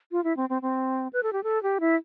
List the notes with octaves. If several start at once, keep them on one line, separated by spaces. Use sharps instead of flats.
F4
E4
C4
C4
C4
B4
A4
G4
A4
G4
E4